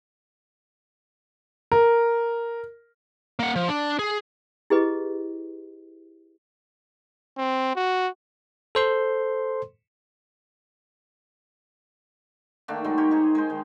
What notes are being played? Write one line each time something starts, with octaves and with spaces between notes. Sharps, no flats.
A#4
A#3 F#5
F3
D4
G#4
E4 G4 G#4 B4 D#5
C4
F#4
A4 C5 C6
D#3 A3 A#3 D4
D#3 F#3 G#3
G4 A#4 C#5
D#4 G#4 C5
G#3 G#4 C5
D#3